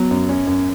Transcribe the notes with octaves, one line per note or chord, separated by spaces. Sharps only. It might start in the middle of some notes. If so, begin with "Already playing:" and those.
Already playing: F#3 B3
F#2
C#4
F#2